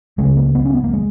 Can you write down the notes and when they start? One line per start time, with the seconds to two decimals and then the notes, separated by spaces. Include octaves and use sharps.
0.18 C#2 C#3 G#3
0.37 A#3
0.55 B3
0.65 C#4
0.75 B3
0.84 A#3
0.93 G#3